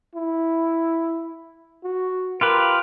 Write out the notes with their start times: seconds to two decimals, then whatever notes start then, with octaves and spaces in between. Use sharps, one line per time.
0.15 E4
1.84 F#4
2.41 F4 G4 A#4 B4